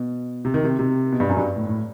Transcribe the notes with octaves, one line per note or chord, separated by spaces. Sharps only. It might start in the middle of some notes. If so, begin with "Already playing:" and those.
Already playing: B2
C3
D#3
C3
C3
B2
G2
F#2
G2
A2
A2